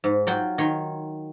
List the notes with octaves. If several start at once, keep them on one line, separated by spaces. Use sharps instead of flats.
G#2
F#3 F4 F#5 G5
D#3 C#5 C6